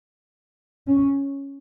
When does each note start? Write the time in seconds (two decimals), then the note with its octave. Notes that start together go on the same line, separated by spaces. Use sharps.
0.87 C#4